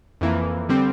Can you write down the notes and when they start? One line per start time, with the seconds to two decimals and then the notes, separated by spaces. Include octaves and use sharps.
0.21 F2 E3 A#3
0.69 D3 G3 C4